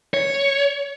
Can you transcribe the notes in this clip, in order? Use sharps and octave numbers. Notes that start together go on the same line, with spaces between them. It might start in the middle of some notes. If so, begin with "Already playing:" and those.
C#5